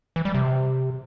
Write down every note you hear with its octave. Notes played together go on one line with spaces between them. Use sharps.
E3
G3
C3